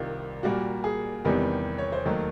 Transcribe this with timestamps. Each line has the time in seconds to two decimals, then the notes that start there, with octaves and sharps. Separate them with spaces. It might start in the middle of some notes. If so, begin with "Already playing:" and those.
Already playing: C2 C3 D#3 F4
0.43 A#2 G3 A#3 F#4
0.84 G#4
1.25 E2 C3 D#3 G3 B3
1.78 C#5
1.92 C5
2.05 D#2 D#3 F#3 A3